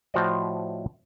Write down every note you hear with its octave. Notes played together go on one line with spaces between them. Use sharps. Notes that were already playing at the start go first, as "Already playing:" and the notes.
A2 F3 F#4 C5 D5 D#5